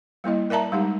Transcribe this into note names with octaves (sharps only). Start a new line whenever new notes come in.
G3 A#3 E4 D#5
A#4 D5 E5 A5 A#5
G3 G#3 D#4 G4